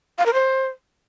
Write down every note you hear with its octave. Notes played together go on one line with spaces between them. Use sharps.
F5
A#4
C5